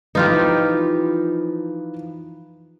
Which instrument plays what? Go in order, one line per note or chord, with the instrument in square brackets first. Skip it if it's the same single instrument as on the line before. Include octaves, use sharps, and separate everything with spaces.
[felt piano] E3 F3 B4 [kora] D#4 F4 G4